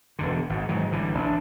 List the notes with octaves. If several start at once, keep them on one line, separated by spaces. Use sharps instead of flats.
E1 E2 D3
G#1 G#2
G#2 D#3 E3 F#3
A1 D3 E3 G3
A1 D4